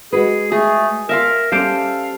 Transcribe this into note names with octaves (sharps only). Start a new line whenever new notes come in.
G#3 F#4 G#4 B4
A3 G#4
A#4 E5 F5 C6
G3 C#4 A4 C5 F5 D6